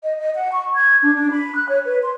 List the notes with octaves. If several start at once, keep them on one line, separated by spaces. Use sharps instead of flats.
D#5
D#5
F#5
C#6
G#6
D4
D4
B5
F#6
C#5
B4
C6